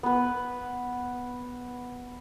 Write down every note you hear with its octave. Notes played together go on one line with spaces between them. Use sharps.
B3 B4